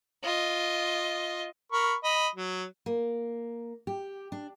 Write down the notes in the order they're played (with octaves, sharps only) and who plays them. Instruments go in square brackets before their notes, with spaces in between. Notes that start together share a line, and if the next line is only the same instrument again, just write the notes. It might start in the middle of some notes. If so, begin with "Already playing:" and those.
[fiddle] F4 D#5
[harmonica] A#4 B5 C#6
D#5 B5
F#3
[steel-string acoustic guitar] A#3
G4
D4